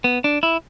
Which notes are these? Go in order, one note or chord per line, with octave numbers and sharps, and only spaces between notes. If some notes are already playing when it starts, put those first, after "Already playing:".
B3
D4
E4